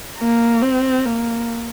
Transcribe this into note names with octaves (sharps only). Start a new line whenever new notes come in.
A#3
C4
A#3